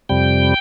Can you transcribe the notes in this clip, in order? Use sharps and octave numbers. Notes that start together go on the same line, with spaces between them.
F2 C3 G3 G5